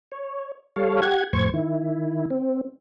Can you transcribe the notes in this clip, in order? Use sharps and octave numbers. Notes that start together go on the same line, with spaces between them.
C#5
G3 A4 C#5 F5
G4 F#5 G#6
F2 A2 C5 C#6 G#6
D#3 E4
C4